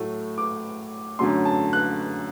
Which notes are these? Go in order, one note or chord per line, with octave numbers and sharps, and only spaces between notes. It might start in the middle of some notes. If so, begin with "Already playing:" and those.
Already playing: A2 F#3 A3
D6
F#2 D3 F#3 A3 C6
A5
F#6